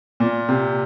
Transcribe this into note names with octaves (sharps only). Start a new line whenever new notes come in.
A#2
C3